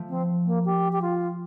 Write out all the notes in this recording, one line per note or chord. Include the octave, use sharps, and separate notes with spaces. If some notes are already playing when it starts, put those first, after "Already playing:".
Already playing: F3 A3
C4
A#3
G4
G4
F4